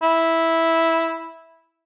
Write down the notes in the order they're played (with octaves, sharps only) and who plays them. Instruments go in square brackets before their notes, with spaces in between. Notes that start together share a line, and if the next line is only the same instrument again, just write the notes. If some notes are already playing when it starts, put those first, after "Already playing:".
[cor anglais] E4